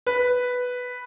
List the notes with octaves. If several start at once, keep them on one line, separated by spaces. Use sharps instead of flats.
B4